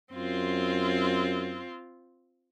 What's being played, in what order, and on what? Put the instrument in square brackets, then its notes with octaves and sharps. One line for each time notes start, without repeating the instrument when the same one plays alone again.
[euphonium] F#2 [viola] C4 F4